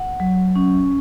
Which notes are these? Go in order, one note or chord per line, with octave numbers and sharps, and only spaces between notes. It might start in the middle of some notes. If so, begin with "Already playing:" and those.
Already playing: F#5
F#3
C#4